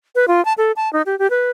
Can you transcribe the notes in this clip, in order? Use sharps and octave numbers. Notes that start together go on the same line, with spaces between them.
B4
F4
A5
A4
A5
D#4
G4
G4
B4